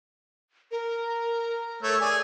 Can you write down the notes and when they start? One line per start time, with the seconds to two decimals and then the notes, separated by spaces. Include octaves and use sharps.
0.71 A#4
1.83 A3 C#5 E6
2.01 G#4 D5 G#5